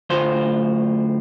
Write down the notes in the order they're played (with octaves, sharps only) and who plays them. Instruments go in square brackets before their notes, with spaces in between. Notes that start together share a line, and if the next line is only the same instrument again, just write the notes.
[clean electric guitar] D2 A2 F4 C5